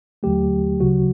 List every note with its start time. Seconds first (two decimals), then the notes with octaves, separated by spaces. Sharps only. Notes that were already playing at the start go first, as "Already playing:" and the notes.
0.23 D#2 D3 F#3 A3 G4
0.80 D2 C#3 F#3 F#4